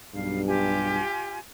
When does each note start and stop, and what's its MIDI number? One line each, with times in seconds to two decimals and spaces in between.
0.14 1.00 35
0.14 1.00 43
0.14 0.42 77
0.46 1.39 65
0.46 1.39 67
0.46 1.39 80